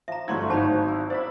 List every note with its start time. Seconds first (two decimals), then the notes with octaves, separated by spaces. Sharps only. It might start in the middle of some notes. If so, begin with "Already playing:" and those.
0.08 F3 E5 A#5
0.28 G1 F#3 G3 A3 E4 C6 C#6 G#6
0.49 G#1 D#4 F#4 C5 A5 B5
0.88 E4
1.10 C5 D5 E5 B5